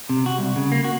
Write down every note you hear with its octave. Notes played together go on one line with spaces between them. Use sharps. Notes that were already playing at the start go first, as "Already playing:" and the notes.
C3
F#4
C2
C#3
A#3
F#4